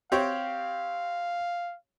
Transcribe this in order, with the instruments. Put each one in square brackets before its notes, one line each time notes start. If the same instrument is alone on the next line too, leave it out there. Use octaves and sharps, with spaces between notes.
[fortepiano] C4 G4 C#5 [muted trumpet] F5